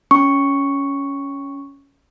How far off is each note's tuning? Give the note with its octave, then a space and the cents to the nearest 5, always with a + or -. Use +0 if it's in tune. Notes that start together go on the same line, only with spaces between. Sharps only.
C#4 +10 C#6 +0